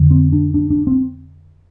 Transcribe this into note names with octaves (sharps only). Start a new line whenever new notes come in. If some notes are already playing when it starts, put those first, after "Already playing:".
Already playing: F2 D3
C4
D4
D4
D4
C4